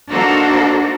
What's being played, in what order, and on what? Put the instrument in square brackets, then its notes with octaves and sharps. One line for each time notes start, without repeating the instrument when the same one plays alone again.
[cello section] A#3 D4 D#4 F#4 A4 C5